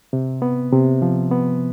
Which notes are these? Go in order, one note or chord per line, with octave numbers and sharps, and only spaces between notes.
C3
B3
C3
F3
B3